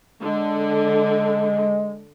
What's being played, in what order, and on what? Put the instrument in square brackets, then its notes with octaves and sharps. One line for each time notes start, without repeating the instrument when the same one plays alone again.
[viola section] D3 [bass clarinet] G#3